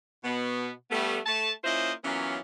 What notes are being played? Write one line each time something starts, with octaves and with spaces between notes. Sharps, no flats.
B2 B3
G3 A3 B3
A3 A5
A#3 C#4 E4 F4 C5 D#5
E3 F#3 A#3 B3 C#4 F4